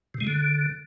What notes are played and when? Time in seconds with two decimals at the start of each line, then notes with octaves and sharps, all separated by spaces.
0.14 C3
0.21 G#3
0.27 D3